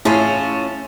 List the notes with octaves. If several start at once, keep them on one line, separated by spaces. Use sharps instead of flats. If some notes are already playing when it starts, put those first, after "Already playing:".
A2 C#4 E4 F4 G#4 A5 C6